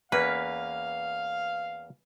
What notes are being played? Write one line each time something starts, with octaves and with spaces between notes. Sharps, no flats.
E2 A#3 C#4 B4 F5